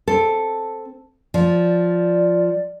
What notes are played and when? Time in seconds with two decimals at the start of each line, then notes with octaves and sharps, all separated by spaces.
0.07 C4 A4
1.34 F3 D5